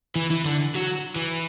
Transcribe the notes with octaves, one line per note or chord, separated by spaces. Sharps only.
E3
E3
D3
F#3
E3